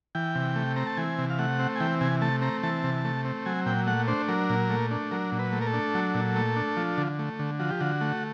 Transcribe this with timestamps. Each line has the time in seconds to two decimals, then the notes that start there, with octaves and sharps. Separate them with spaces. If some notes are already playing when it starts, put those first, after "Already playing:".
0.15 E3 G5
0.35 C3
0.56 A3
0.76 C4 A#5
0.87 A5
0.97 E3 G#5
1.18 C3
1.30 F5
1.39 A3 F#5
1.59 C4
1.76 G#5
1.80 E3 G5
2.01 C3 G#5
2.21 A3 A5
2.42 C4 A#5
2.63 E3 A5
2.84 C3
3.05 A3
3.25 C4
3.46 F#3 G#5
3.66 A#2 G5
3.87 A3 F#5
4.08 D4 C5
4.28 F#3 A#4
4.50 A#2
4.70 A3
4.91 D4
5.11 F#3 A#4
5.32 A#2
5.39 B4
5.53 A3
5.61 A#4
5.67 A4
5.74 D4
5.94 F#3
6.15 A#2
6.36 A3
6.56 D4
6.77 F3
6.98 D3
7.19 A3
7.39 D3
7.59 F3 F#4
7.70 G4
7.80 D3 F#4
8.01 A3